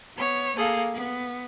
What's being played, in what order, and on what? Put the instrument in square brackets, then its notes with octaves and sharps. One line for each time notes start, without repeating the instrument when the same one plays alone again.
[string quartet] B3 C#5
A#3 G#4 A4 F5
B3